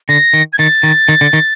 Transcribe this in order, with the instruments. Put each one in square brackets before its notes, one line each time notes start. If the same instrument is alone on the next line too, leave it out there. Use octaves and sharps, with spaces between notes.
[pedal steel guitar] D3 [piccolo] A#6
[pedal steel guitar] D#3
[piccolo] G#6
[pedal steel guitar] D#3 [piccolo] A6
[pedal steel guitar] D#3
D#3
D3
D#3